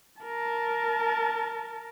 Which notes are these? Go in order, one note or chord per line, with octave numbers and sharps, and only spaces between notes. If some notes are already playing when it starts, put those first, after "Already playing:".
A#4 A5